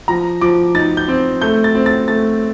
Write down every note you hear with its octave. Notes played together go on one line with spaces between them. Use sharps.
F3 A#5
F3 D6
D#4 A6
G6
C4
A3 G6
A6
C4
A6
A3 A6